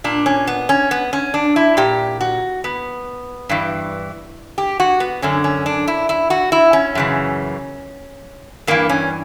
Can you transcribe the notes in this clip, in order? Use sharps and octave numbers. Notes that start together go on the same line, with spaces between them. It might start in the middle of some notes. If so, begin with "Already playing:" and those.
A#2 D4
C#4
B3
C#4
B3
C#4
D4
E4
A#2 G4
F#4
B3
G2 E3
G4
F#4
B3
F#2 D3 C#4
C#4
D4
E4
E4
F#4
E4
C#4
F#2 C#3 E3
G2 E3 A#3
C#4